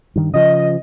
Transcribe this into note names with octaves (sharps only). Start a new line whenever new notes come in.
G2 D#3
C#3 F3 D#5